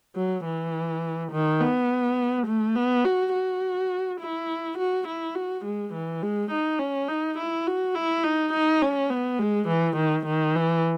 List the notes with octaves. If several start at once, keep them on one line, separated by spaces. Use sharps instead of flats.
F#3
E3
D#3
B3
A3
B3
F#4
F#4
E4
F#4
E4
F#4
G#3
E3
G#3
D#4
C#4
D#4
E4
F#4
E4
D#4
D#4
C#4
B3
G#3
E3
D#3
D#3
E3